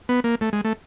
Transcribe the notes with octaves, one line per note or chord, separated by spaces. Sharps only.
B3
A#3
A3
G#3
A3